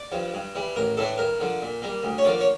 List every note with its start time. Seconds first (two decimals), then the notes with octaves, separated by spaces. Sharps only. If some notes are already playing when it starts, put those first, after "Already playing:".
Already playing: D5
0.12 G2 F3
0.34 G2
0.55 E3 G3
0.76 A1 A#4
0.97 A2 E3 A3 D4 A4
1.18 G2 A#4
1.40 D3 F3
1.62 A#2
1.82 G3 A#3
2.03 D2
2.18 C#5
2.24 D3 F3 A#3 D5
2.40 C#5